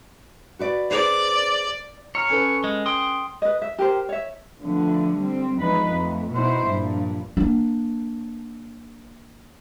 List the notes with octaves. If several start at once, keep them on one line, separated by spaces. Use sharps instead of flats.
F#4 B4 D5
G#4 B4 C5 D5
C#5 A#5 F6
C#4 A4 B4
G#3
G5 C6 D#6
B4 D#5
E5
G4 A#4 C5
C#5 E5
D3 F3 A3 B3
G3 C4
E2 F3 G#3 D#4 B4
F2 A3
B2 D#4 E4 C5
G2 A#2 F3
A#3 D4